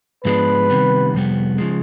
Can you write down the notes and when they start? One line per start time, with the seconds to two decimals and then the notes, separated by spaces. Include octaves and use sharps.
0.24 G#2 F3 G#3 B3 D4 B4
0.70 C3 D#3 G3 B3
1.14 F2 C3 G3 B3
1.58 C#3 F3 G#3